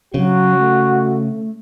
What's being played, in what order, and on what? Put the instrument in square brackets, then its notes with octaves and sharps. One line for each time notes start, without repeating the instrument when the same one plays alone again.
[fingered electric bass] C#3 [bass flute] F#3 [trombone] F#4
[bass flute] A3